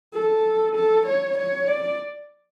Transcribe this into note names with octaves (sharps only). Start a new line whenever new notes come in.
A4
A4
C#5
C#5
D5